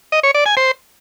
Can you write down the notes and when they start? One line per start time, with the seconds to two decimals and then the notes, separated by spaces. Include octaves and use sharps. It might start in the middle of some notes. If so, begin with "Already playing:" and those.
0.12 D#5
0.23 C#5
0.35 D5
0.46 G#5
0.57 C5